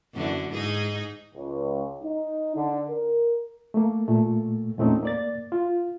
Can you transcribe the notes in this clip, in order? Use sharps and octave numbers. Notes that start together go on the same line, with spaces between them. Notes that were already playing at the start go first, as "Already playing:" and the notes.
F#2 D3 E3
G#2 D#4 G#4
C#2
D#4
D3
A#4
A3 A#3
A#2 A3
E2 A#2 A3 C4 C#4 D#4
A#3 D5 A6
F4